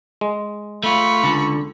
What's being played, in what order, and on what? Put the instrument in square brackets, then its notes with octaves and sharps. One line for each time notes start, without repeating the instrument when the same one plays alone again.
[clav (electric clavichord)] G#3
[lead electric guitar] A3 F4 [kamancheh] B5 C#6
[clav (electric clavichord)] C#2 [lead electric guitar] D3